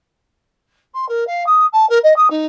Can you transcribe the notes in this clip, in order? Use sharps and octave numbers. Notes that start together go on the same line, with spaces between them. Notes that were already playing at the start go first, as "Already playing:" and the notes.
C6
A#4
F5
D#6
A5
A#4
D#5
D#6
D#4